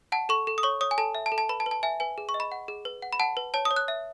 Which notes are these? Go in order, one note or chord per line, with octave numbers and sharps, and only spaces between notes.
F#5 A5
A4 C#6
A4
D#6
C#5 C#6
C#5 D#6
G#5
A4 A5
E5
A5
A4
A5
B4 B5
A5
B4
A5
E5 G#5
B4 G#5
G#4
C#6
D#5
B5
F#5
G#4
B4
F#5
B5
F#5 A5
B4
C#5 A5
D#6
C#5
F#6
E5